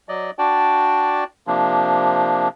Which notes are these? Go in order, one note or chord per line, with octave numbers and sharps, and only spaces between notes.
F#3 D5 D#5
D4 F#4 D5 G5 A5
C3 F3 A#3 D4